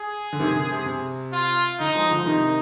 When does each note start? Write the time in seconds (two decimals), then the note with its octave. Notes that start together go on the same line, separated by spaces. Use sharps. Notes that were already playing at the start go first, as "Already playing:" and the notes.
Already playing: G#4
0.33 D3
0.39 C3 D#3
0.56 D3
0.71 C3
0.86 C3
1.33 F4
1.80 D3 D#4
1.95 F3 G#3
2.10 D3 F3
2.26 C3 D#3 D#4